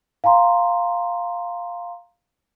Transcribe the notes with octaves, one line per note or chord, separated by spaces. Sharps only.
F5 G#5 A#5 C6